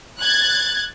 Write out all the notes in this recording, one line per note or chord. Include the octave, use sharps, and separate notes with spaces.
F#6 G#6 A6